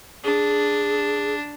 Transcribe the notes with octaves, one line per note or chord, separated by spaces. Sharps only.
D4 G#4